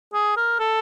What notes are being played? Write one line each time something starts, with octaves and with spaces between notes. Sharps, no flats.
G#4
A#4
A4